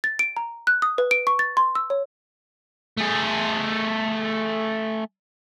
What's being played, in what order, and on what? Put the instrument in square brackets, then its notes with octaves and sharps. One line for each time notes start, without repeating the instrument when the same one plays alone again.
[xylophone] A6
D7
A#5
F#6
D#6
B4
D7
C#6
A6
C6
E6
C#5
[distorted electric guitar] A3 G#4